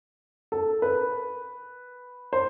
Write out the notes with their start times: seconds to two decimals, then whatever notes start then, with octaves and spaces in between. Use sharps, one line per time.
0.52 A4
0.82 B4
2.33 C5